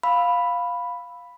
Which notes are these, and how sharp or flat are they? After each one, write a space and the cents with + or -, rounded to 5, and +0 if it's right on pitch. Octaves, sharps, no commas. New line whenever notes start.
F5 +10 B5 +0 E6 +0